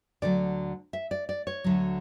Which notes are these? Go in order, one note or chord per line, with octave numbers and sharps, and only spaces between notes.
D2 D3 F#3 D5
E5
D5
D5
C#5
D2 D3 F#3